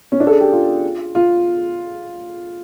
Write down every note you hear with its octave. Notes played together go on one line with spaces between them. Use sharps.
C#4
D4
A4
G#4
G4
F4
F4